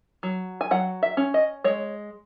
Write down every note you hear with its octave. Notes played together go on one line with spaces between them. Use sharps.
F#3
G#5
F#3 F#5
E5
C#4
D#5
G#3 C#5